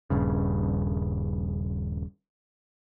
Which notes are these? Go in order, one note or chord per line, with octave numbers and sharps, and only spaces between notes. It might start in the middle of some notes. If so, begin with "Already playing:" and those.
D#1 G2 C#3